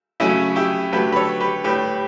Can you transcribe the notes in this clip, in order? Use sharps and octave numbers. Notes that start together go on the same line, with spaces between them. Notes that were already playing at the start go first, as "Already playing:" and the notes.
C#3 F#3 A3 C#4 E4
E4 G4
D3 F#3 A3 G4 B4
B4
A4 C#5
G4 B4
A2 G3 G4 B4